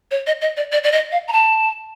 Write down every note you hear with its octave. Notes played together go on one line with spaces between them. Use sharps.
C#5
D#5
D#5
D5
D5
D5
D#5
F5
A#5
A5